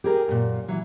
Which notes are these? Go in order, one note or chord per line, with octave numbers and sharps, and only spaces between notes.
G4 G#4 A#4
F#2 A#2
E3 F#3